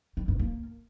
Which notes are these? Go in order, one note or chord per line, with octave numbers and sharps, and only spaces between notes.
G3
G2
A#3